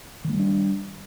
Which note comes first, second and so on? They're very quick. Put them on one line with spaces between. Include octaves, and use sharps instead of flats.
D#3 A3 G3 D4